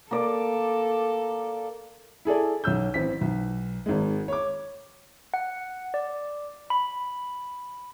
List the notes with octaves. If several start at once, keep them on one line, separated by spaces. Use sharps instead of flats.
A#3 A4 D5
E4 G#4 A4 D5
B1 C#4 E6 G6
A1 C4 B6
B1
G#1 G#3
C#5 D6
F#5
D5
B5